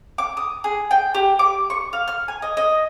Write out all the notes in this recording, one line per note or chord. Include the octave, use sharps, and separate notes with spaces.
D6
D#6
G#4
G5
G4
D6
C#6
F5
F6
G#5
D#5
D#5